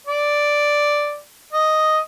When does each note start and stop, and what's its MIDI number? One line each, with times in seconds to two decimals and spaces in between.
0.07 1.16 74
1.53 1.98 75